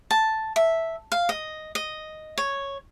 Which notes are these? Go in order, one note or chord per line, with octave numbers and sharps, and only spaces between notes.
A5
E5
F5
D#5
D#5
C#5